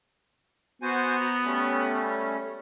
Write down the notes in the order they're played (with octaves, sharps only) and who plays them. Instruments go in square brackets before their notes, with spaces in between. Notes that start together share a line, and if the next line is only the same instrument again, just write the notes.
[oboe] B3 [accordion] F#4 C5 G#5
[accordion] A#5
G3 A3 C#4